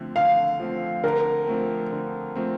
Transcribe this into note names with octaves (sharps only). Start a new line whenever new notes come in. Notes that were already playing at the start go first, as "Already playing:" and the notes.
Already playing: D3 F3 A3 C4
D3 F5
F3 A3 C4
D3 A#4
F3 A3 C4
D3
F3 A3 C4